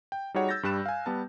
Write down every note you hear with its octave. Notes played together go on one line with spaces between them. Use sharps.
G5
G3 D#4 F#4 G#4 C#5 F#5
E6 G6 A6 A#6
G2 G3 F#6 E7
F5 G#5
G3 B3 A5